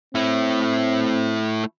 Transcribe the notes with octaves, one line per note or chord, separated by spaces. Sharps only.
A3 C4 E4